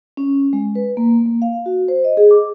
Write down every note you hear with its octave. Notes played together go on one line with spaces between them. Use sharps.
C#4
G#3
B4
A#3
A#3
F5
F#4
C5
D#5
G#4
D6